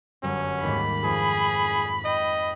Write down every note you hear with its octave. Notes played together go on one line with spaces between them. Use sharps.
G1 F#2 C#4
D#2 G#2 B5
F2 G#4
D#5 G5